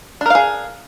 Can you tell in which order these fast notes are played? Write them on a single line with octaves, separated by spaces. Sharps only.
D4 A#4 F5 G#4